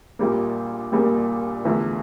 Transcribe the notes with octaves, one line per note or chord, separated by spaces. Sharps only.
A#1 A#2 G3 A#3
A#1 A#2 G3 A#3
E2 D3 F3 A3